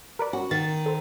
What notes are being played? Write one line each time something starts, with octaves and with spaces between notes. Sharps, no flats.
A#4 B4 D5
C#4 F#4
D#3 A6
A4 C5